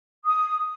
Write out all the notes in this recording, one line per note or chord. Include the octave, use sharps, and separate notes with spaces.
D#6